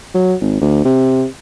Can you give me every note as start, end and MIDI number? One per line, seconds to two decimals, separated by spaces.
0.14 0.35 54
0.40 0.60 32
0.61 0.85 38
0.85 1.25 48